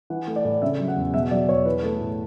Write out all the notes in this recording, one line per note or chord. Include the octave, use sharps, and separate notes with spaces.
E3 F#5
A3
D5
A2
C#3 E5
F#3
F#5
E2
B2 E5
F#3 D5
E2 C#5
E3 B4
A3
A2